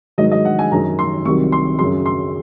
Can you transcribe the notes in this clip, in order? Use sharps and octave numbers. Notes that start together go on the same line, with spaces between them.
G#2 D#3 F#3 D#5
D#5
F#5
G#5
F#2 D#3 F#3 A#5
C6
C2 C3 D#3 F#3 C#6
C6
F#2 C#3 F#3 C6
C6